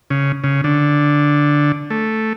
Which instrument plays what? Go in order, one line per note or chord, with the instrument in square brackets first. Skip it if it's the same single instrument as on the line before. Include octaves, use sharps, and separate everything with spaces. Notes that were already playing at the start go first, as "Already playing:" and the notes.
[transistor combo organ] C#3
C#3
D3
A3